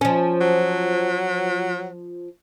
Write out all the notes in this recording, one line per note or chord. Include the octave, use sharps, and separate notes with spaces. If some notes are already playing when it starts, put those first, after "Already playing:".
F3 C#4
F#3